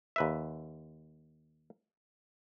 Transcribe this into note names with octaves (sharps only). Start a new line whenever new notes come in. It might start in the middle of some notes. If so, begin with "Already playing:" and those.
D#2 B4 E5